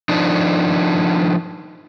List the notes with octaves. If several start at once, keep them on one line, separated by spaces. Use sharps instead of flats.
F3 D4 D#4